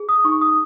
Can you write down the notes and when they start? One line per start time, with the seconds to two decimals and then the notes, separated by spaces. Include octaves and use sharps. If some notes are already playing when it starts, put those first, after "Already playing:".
Already playing: G#4
0.09 D#6
0.24 D#4 C#6
0.41 D#6